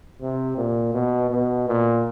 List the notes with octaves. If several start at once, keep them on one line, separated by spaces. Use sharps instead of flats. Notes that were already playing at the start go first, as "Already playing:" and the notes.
C3
A#2
B2
B2
A#2